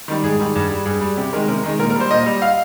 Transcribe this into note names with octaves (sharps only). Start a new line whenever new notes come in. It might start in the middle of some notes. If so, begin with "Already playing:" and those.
D#3 G3
G#2 G#4
D#3 G3
G2
G3
G2 G#4
G3
C3 G4
D#3 G#3 A#4
C3 A#4
D#3 G#3
A#2 A#4
A#4
G3
C5
A#2 D#5
G3
F5